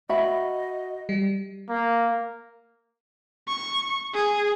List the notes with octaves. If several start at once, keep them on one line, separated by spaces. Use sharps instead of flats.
F#4 D#5 E5 B5
G3
A#3
C#6
G#4